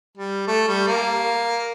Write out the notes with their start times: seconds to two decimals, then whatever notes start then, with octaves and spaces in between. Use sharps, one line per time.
0.18 G3
0.48 A3
0.68 G3
0.87 A#3